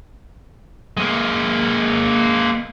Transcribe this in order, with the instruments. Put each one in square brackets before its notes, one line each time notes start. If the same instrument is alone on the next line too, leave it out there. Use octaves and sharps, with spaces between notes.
[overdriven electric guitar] G#3 A#3